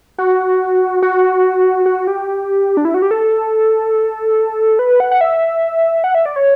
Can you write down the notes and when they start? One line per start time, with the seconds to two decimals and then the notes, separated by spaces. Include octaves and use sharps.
0.18 F#4
1.02 F#4
1.86 F#4
2.07 G4
2.77 D4
2.85 E4
2.94 F#4
3.02 G4
3.11 A4
4.79 B4
5.00 F#5
5.11 F#5
5.21 E5
6.04 F#5
6.15 E5
6.26 D5
6.36 C#5